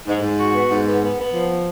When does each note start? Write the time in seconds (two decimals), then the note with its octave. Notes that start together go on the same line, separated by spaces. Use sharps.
0.07 G#2
0.22 G#2
0.38 F#4
0.53 B3
0.70 G#2
0.85 B3
1.01 B3
1.18 B3
1.33 F3